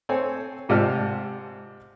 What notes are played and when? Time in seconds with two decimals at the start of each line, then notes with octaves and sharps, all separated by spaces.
0.09 C4 A4 C#5 G#5
0.69 G#2 C3 F4 D5 A5 F6